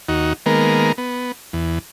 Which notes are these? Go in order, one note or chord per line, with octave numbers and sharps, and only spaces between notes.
D#2 D#4 F#4
D#3 G#3 A#3 B3 A#4
B3
E2